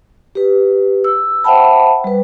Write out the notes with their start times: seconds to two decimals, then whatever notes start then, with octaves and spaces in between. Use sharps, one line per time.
0.35 G4 B4
1.04 E6
1.44 C5 E5 F#5 G5 A5 B5
2.04 G3 B4